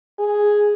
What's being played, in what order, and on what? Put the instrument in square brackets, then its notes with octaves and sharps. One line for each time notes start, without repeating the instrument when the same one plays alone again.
[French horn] G#4